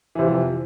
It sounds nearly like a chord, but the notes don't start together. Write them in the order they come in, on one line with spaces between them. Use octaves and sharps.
E3 C3 F3 F2